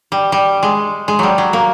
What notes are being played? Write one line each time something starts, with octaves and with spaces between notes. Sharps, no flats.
G3
G3
G#3
G#3
F#3 G3
F#3
A#3